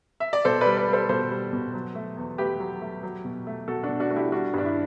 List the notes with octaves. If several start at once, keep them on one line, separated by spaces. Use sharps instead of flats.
E5
D5
B2 A4 C5
G3 B4 D5
B4 D5
G3
A4 C5
B2 A4 C5
G3
B2
F#3
A3
E2
A3 G4 B4
F#3
A3
F#3
B2
A3
B2 F#4 A4
D4 F#4
B2
D4 F#4
A3 F#4
E4 G4
G3 D4 F#4
G2 D4
E4